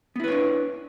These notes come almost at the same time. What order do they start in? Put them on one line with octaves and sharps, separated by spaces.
B3 E4 B4 C#5 D4